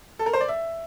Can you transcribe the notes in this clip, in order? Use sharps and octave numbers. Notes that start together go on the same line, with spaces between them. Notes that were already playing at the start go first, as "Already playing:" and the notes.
A4
A#4
C5
D5
E5